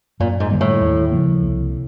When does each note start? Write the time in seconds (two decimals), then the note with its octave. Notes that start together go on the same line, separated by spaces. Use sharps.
0.20 F#2 A#2
0.40 G#2
0.51 D3 G3 A#3
0.61 A2
0.81 D#2
1.12 C#3 F3 A#3
1.42 C2